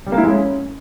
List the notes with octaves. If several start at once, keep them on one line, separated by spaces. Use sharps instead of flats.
G3
A#3
E4
G#3
C#4